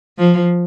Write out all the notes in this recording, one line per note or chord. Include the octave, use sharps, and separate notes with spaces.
F3